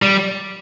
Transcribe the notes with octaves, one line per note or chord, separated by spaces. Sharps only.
G3